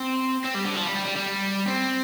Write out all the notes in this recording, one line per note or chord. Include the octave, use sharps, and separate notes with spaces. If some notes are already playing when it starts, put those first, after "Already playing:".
Already playing: C4
C4
G3
D3
F3
G3
G3
G3
G3
C4